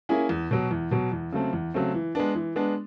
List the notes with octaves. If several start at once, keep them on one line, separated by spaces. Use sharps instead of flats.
A#3 C#4 E4 G#4
E2
B2 F#3
E2
B2 F#3
E2
C#3 F#3 A3 C4
E2
C#3 F#3 A3 C4
E3
G#3 B3 D4
E3
G#3 B3 D4